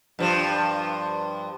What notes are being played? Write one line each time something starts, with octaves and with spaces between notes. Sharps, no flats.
G2 F3